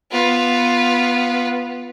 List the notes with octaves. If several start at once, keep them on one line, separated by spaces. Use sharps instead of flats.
B3 F4